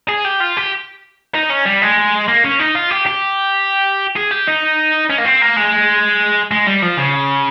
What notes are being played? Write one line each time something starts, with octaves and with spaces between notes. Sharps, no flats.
G#4
G4
F4
G4
D#4
C#4
G3
G#3
A#3
C#4
D#4
F4
G4
G4
G#4
G4
D#4
C#4
A#3
C4
A#3
G#3
G#3
G3
F3
C#3